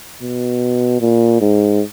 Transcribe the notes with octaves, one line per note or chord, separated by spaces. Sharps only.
B2
A#2
G#2